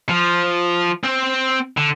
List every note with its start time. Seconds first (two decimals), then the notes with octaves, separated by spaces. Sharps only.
0.09 F3
1.04 C4
1.77 D3